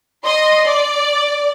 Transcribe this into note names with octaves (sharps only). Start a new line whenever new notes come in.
D#5 C6
D5